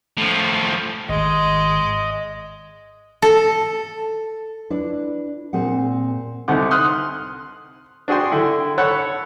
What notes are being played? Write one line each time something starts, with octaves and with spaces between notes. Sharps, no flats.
A2 F3
G#1 G#3 D#5
A4
D4 E4 B4
A#2 C4 G#4 F#5
C2 D3 D#4 F#5 D6
C6 D#6 F6 F#6
D4 F#4 G#4 G5 C6
D3 E4 G5
A4 C#5 F#5 B5 F#6